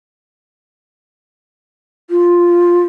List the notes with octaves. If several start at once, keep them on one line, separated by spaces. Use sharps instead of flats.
F4